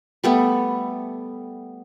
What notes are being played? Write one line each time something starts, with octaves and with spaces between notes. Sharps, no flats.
G3 A3 B3